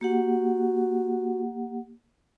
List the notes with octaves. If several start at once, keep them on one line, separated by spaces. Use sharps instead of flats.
A#3 F#4 G4 F#5